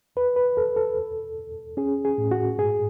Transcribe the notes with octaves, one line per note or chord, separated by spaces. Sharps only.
E2 B4
B4
E2 A4
A4
E2
E2
C#4 G#4
G#4
A2
F#4
G#2 G#4